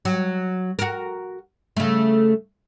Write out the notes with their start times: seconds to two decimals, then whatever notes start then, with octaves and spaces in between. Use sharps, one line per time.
0.05 F#3
0.79 F#4 A#4
1.77 C#3 A3